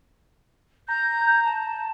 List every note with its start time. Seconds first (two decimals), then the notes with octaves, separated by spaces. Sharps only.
0.88 A#5 G6
1.45 A5